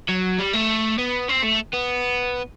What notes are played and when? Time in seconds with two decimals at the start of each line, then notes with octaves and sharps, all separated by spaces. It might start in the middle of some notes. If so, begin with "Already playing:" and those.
0.09 F#3
0.38 G3
0.53 A3
0.98 B3
1.29 C4
1.44 A3
1.74 B3